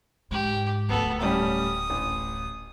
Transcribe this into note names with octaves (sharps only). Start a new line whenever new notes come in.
G#2 G4
D1 D2 B3 A4
A2 G3 C#4 D#6
A1